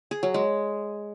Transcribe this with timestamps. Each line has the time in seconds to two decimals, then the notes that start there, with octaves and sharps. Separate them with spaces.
0.11 G#4
0.23 F#3
0.34 G#3